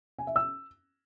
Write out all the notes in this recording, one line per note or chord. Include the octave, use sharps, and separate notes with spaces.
G#5
E5
E6